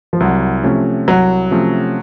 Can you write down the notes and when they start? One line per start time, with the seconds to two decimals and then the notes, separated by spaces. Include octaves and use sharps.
0.13 F3
0.20 C2 F#3
0.64 C3 F3 A3 C#4
1.08 C2 F#3
1.51 C3 F3 A3 C#4